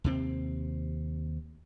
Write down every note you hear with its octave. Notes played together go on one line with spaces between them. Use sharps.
D#2 C3 C4